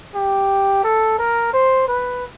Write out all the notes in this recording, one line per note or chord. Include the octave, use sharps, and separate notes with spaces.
G4
A4
A#4
C5
B4